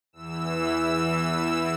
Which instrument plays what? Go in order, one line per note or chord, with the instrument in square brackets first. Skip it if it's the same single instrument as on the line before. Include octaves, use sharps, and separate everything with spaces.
[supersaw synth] E2 E3 E6